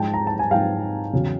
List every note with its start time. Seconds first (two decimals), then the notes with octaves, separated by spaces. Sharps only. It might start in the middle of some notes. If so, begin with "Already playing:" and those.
Already playing: G#2 F3 G#3 G5 A5
0.14 A#5
0.27 A5
0.39 G#5
0.51 G#2 F3 G#3 F5 G5
1.13 E2 C#3 F#3